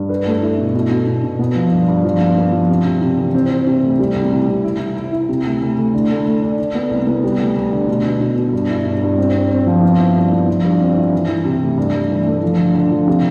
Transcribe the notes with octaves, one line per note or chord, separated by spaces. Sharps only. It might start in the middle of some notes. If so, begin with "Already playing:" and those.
Already playing: G2
B4
A3
E4
B2
B2
B2
B2
B2
B3
F3
G2
G2
F3
B3
B3
F3
C3
C3
C3
E3
C4
C4
C3
D2
G3
C2
C3
C3
E4
E4
E4
E4
C3
D2
D2
D2
D3
A3
A3
D4
D4
B3
C2
B3
G3
D2
D2
D3
B2
B2
B2
B2
G2
E4
G2
G2
C4
C4
C4
F3
B3
E4
G2
B3
F3
G2
C4
E4
E3
E3
C3
D2
G2
G2
E3
A3
F3
D3
D3
F3
C3